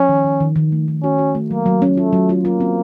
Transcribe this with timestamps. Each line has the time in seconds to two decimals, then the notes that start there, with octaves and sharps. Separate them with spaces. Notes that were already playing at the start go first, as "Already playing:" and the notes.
Already playing: F3 C#4
0.09 D#3
0.24 D#3
0.40 D#3
0.56 D#3
0.72 A3
0.88 D#3
1.03 C#4 F#4
1.18 F#4
1.35 A3
1.50 F#3 A#3
1.66 F#3
1.82 C#4
1.97 A3 F4
2.13 F#3
2.29 F4
2.44 A#3 F4
2.60 C4